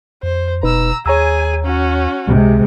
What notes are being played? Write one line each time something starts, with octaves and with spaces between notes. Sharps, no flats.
F2 C5
F1 B2 D#4 B4 A#5 E6
D#2 G#4 C#5 G#5 A#5 E6
C#4 F#4
C#2 C3 G#3